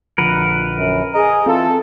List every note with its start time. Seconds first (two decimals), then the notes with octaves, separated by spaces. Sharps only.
0.18 A#1 D3 F3 A#4 B4 F#5
0.75 F#2
1.14 G#4 D#5 A#5
1.46 E3 C4 F4 A4